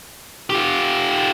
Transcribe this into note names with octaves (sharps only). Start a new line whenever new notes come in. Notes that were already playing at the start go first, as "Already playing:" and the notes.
F4 G4